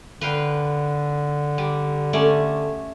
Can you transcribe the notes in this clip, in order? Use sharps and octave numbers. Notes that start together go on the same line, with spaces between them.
D3 B4 F5 G5
G3
A3 C#4 D5